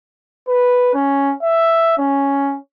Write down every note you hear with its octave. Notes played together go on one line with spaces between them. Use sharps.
B4
C#4
E5
C#4